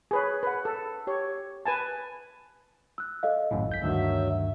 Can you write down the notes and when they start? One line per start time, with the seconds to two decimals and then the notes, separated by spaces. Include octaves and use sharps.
0.11 G#4 B4 C#5
0.43 B4 F#5
0.65 A4
1.07 G4 C#5
1.66 B4 G#5 A5
2.98 E6 F#6
3.23 A4 D#5 F5
3.51 G#1 F#2 A2
3.69 C2 G6 B6
3.82 D2 G2 D#3 F#3 E5